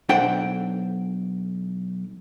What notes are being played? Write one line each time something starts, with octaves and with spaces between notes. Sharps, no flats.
B1 D4 A4 C5 F#5 G5